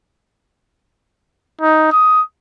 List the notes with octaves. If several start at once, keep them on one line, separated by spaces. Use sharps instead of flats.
D#4
D#6